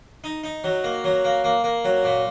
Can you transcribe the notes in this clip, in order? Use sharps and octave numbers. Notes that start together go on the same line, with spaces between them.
D#4
D#4
F#3
A#3
F#3
A#3
A#3
A#3
F#3
A#2